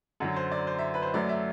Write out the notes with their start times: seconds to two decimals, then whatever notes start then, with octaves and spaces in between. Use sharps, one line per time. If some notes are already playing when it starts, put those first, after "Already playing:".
0.20 F#2 D3 F#3 F#5
0.36 C5
0.51 D5
0.67 C5
0.79 E5
0.94 B4
1.02 C5
1.14 F#2 F#3 A3 D5
1.29 E5